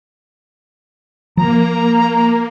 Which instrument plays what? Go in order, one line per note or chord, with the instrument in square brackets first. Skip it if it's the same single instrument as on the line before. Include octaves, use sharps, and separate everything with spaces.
[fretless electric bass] F3 [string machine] A#3 [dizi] A#5